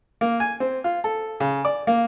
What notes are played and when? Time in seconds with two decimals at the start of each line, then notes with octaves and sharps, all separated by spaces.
0.21 A#3
0.40 G#5
0.60 C4
0.84 F4
1.04 A4
1.40 C#3
1.65 D5
1.87 A#3